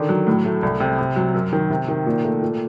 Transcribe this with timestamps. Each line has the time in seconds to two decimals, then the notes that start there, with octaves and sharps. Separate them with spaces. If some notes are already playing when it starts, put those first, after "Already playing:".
Already playing: D3 D#3
0.09 F#3
0.27 A2
0.45 A3
0.63 C2
0.80 C3
0.99 C3
1.16 F#3
1.34 F#2
1.53 D#3
1.70 C3
1.88 D#3
2.06 A#2
2.24 A3
2.42 A#2